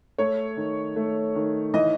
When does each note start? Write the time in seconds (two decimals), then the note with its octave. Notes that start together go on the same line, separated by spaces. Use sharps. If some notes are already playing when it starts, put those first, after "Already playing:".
0.18 A3 C#5
0.57 D#3
0.96 A3
1.35 D#3
1.74 E3 D#5